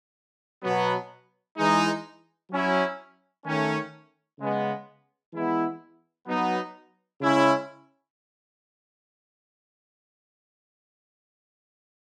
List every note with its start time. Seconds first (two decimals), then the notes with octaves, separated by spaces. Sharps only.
0.63 B2 F#3 B3
1.58 E3 G#3 D#4
2.51 F#3 C#4 E4
3.45 D#3 A3 C#4
4.40 C#3 G#3 B3
5.33 E3 G#3 B3 E4
6.26 F#3 B3 D#4
7.20 C#3 G#3 C#4 E4